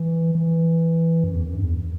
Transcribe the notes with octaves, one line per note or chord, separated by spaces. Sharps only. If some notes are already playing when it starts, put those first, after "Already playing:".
Already playing: E3
E3
F#2
E2
F#2
G2
E2